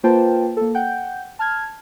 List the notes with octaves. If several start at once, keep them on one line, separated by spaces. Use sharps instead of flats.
A#3 F4 B4 C5 G5 A5
A#3 A4
F#5 G5 G6
A5 F6 G#6